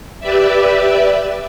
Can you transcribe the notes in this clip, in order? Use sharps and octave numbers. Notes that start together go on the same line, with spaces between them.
G4 B4 D5 E5